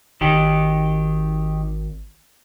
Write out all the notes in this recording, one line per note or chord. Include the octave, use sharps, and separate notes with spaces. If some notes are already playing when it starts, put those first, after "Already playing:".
G#1 D#3 G4